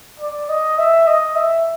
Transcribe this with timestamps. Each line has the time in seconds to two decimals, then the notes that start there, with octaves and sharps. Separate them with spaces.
0.20 D5
0.50 D#5
0.79 E5
1.07 D#5
1.36 E5